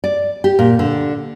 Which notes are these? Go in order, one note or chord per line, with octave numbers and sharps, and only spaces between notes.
D5
G4
A#2
D3